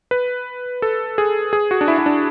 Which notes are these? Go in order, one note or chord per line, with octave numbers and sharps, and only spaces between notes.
B4
A4
G#4
G#4
F#4
D4
E4
E4
D4